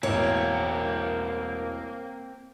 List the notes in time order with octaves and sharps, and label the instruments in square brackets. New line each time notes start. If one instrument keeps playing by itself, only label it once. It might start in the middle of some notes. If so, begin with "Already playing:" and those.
[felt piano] E1 A1 [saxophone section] A#3 [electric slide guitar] C4 A#4 [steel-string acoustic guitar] C#5